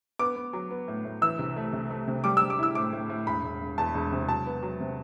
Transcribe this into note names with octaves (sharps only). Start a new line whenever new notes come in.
B3 D6
B3
F#3
B3
A2
A2
E3 E6
C2
A3
C2
A3
C3
G3 D6
G3 E6
D6
E4 E6
A2 D6
A2
A2
E1 B5
E1
E1
E2 A5
E1
C3
F#3 A5
B3
F#3
C3